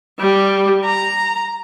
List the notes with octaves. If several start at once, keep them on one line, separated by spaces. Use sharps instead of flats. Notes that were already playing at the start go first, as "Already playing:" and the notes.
G3
A#5